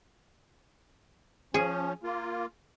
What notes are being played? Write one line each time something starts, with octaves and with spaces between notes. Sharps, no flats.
F3 C#4 G#4
A#3 F4